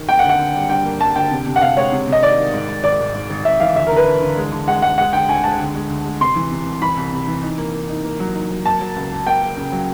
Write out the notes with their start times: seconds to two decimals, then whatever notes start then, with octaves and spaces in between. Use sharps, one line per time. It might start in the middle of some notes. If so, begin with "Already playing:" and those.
Already playing: D#3
0.09 A#3 G5
0.19 F#5
0.24 D3
0.29 F#5
0.39 D3
0.55 G3
0.70 G2 G5
0.85 A#3
1.00 G3 A5
1.15 D3 G5
1.31 C3
1.47 C3
1.56 F#5
1.62 C3 F5
1.77 G#3 C#5
1.92 C3
2.07 C3
2.12 D#5
2.23 D#3 D5
2.38 D#3
2.54 G#2
2.69 G#2
2.84 G#1 D5
3.00 G#1
3.15 G#2
3.30 G#1
3.45 G#1 E5
3.60 E3 F5
3.76 D2 E5
3.87 A#4
3.91 D3
3.96 B4
4.07 D3
4.22 D3
4.37 G#3
4.52 D3
4.68 G#3 F#5
4.82 G#3 F#5
4.98 G#3 F#5
5.13 D3 G5
5.28 D2 G#5
5.44 G#3 A5
5.59 D3
5.75 G#3
5.90 D2
6.06 G#3
6.21 C3 C6
6.36 E3
6.51 C3
6.67 C2
6.82 E3 B5
6.97 C2
7.12 C3
7.28 E3
7.43 D#4
7.58 A#3
7.73 A#3
7.89 D#4
8.04 A#3
8.20 F#3
8.35 D#4
8.50 F#3
8.65 A#3 A5
8.81 F#3
8.96 C#2
9.11 A#3
9.27 A#3 G5
9.42 A#3
9.57 C#3
9.72 F#3